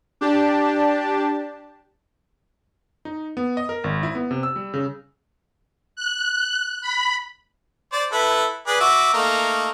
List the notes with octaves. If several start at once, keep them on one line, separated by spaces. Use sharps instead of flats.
D4 G4 A5
D#4
B3
D#5
A#4
G#1
E4
B3
C3
E6
G3
C#3
F#6
B5
C5 D5
E4 A4 B4
G#4 B4 D5
F#4 E5 D6
A3 A#3 D#4